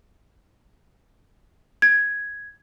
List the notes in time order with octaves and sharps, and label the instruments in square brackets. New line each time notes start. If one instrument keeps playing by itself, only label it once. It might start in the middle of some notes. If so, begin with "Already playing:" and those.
[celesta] G#6